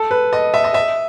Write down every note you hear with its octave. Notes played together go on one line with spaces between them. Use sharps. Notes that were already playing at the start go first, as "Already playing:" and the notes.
Already playing: A4
B4
D#5
E5
D#5
E5